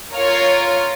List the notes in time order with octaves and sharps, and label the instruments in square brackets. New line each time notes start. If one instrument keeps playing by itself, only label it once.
[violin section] F4 A#4 C#5 F5